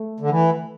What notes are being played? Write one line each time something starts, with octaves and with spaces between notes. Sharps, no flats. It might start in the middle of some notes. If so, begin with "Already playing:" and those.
Already playing: A3
D3
E3